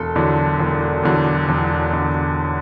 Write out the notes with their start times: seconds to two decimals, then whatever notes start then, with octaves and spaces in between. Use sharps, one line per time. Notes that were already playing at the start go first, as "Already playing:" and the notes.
Already playing: E1 A4
0.15 E2 D3 F#3
0.60 E1
1.03 E2 D3 F#3
1.49 E1
1.93 D3